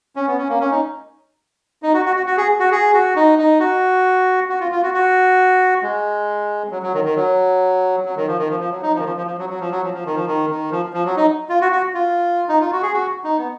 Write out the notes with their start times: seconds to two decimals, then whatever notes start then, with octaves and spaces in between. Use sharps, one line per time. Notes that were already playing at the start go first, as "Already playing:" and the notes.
0.16 C#4
0.27 B3
0.38 C#4
0.49 A#3
0.60 C#4
0.71 D#4
1.83 D#4
1.94 F#4
2.05 F#4
2.16 F#4
2.26 F#4
2.37 G#4
2.60 F#4
2.72 G#4
2.94 F#4
3.16 D#4
3.39 D#4
3.60 F#4
4.49 F#4
4.60 F4
4.72 F4
4.83 F#4
4.94 F#4
5.83 G#3
6.71 F#3
6.83 F#3
6.94 D#3
7.05 D#3
7.16 F#3
8.05 F#3
8.16 D#3
8.27 F3
8.38 D#3
8.50 F3
8.60 F3
8.71 F#3
8.82 D#4
8.94 F3
8.99 D#3
9.05 F3
9.17 F3
9.27 F3
9.38 F#3
9.49 F#3
9.60 F3
9.72 F#3
9.83 F3
9.94 F3
10.05 D#3
10.15 F3
10.27 D#3
10.50 D#3
10.71 F3
10.94 F3
11.05 F#3
11.17 D#4
11.49 F4
11.61 F#4
11.72 F#4
11.94 F4
12.49 D#4
12.61 F4
12.72 F#4
12.82 G#4
12.93 F#4
13.24 D#4
13.38 B3